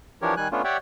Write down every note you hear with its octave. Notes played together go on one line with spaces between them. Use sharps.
E3 F3 D4 G4 A#4 C#5
D#3 G3 G#5 F#6
A3 B3 C#4 D4 F4
G4 C#5 D5 E5 F#5 G5